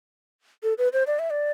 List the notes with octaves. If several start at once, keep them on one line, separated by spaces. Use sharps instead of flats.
A4
B4
C5
D5
E5
D5